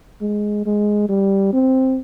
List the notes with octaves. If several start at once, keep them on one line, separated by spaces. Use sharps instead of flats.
G#3
G#3
G3
C4